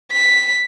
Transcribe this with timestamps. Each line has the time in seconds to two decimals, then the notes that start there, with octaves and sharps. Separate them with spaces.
0.12 B6